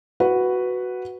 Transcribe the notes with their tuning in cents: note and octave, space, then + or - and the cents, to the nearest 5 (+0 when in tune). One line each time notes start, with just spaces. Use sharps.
F#4 +0 B4 +0 F#5 +0